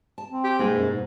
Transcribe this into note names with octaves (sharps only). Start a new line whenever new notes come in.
A5
C4
G4
G#2 B2 G3 A#3
F#2
G#2